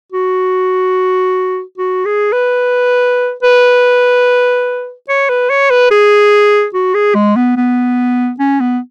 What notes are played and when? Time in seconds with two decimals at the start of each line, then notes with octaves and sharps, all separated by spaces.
0.12 F#4
1.78 F#4
2.05 G#4
2.32 B4
3.43 B4
5.09 C#5
5.30 B4
5.50 C#5
5.70 B4
5.91 G#4
6.74 F#4
6.94 G#4
7.15 G#3
7.36 B3
7.57 B3
8.39 C#4
8.60 B3